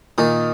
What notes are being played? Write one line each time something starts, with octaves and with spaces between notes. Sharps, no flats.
A#2 D#3 D#4